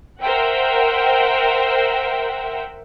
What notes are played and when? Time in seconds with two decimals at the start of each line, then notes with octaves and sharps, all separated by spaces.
0.23 A#4 C5 E5 F#5 G5